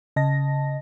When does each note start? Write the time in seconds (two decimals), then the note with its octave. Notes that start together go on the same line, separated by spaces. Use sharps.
0.16 C#3 D#5 A5 A#6